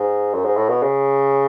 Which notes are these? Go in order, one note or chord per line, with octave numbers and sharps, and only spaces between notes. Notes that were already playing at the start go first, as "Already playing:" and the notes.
Already playing: G#2
F#2
G#2
A2
B2
C#3